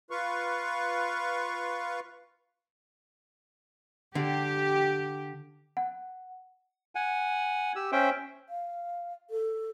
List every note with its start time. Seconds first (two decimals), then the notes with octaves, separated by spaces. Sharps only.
0.11 F4 B4 F5 C#6
4.15 D3 G4
5.77 F#5
6.95 F#5 G#5
7.76 G4 E6
7.92 C#4 C5 E5 G5
8.49 F5
9.30 A4